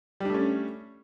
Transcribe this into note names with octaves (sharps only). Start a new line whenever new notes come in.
G3 A3 C#4 D4